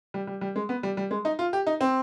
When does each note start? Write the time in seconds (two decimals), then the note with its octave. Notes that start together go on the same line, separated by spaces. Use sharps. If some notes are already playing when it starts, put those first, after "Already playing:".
0.14 G3
0.27 G3
0.41 G3
0.56 G#3
0.69 B3
0.83 G3
0.97 G3
1.11 G#3
1.25 D#4
1.39 F4
1.53 G4
1.66 D#4
1.81 C4